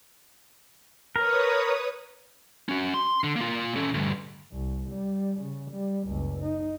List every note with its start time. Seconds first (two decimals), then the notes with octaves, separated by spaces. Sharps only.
1.16 A#4 B4 C#5 D#6
2.69 C#4 F#4
2.94 C6
3.24 D3
3.36 A#3 F4
3.76 C#4 A4
3.94 D2 G2
4.52 C2
4.89 G3
5.40 C#3
5.71 G3
6.07 F#1 C#2
6.42 D#4